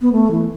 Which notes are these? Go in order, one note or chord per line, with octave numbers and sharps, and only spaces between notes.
B3
A3
E3